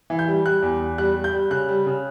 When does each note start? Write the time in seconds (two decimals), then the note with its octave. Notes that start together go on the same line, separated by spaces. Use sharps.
0.10 E3
0.19 G6
0.28 G3
0.45 G3 F#6
0.62 E2
0.81 E2
0.98 G3 F#6
1.16 G3
1.24 G6
1.33 G3
1.50 C#3 F#6
1.69 G3
1.86 C#3